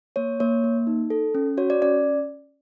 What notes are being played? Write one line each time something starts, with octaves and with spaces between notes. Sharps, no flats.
A#3 C#5
A#3 C#5
A#3
D#4
A4
C#4
F#4 C#5
D5
C#4 D5